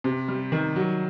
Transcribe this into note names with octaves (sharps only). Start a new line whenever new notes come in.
C3
G3
D#3
F#3